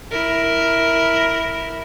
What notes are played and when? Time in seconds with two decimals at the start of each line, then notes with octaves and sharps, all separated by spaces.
0.11 E4 A#4